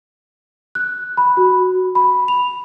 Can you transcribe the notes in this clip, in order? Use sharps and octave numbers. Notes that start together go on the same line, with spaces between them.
F#6
B5
F#4
B5
F7